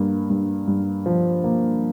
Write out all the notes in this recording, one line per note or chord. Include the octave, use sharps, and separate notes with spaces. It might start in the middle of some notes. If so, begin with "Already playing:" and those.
Already playing: G2 A#3
G2
G2
F3
A#3